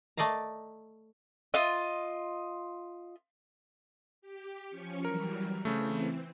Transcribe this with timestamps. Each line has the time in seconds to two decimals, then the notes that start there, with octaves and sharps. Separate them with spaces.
0.17 A3 D5 D#5 F5 A#5
1.54 F4 D#5
4.22 G4
4.70 F3 C#4 C#6
5.05 E3 F#3 G3 A#4
5.65 C#3 E3 A3 C4